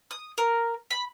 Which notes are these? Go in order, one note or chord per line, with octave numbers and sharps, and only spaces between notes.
D#6
A#4
B5